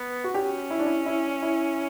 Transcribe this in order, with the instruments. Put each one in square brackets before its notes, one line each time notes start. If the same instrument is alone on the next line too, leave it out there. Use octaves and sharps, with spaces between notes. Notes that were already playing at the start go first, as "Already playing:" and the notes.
Already playing: [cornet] B3
[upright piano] F#4
[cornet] C#4 [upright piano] G4
[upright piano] E4
D4
E4
E4
E4